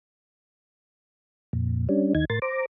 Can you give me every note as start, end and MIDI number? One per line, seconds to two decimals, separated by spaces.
1.53 1.87 41
1.53 1.87 46
1.89 2.13 55
1.89 2.13 61
1.89 2.13 62
2.15 2.25 39
2.15 2.25 51
2.15 2.25 63
2.15 2.25 92
2.30 2.39 45
2.30 2.39 70
2.30 2.39 84
2.30 2.39 93
2.42 2.66 72
2.42 2.66 82
2.42 2.66 86